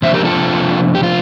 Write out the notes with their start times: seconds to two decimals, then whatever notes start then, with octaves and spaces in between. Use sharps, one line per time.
0.02 C3 F3 A#3 D4 C5 E5
0.14 G4 A#4
0.25 F4 A4
0.95 G4
1.03 F4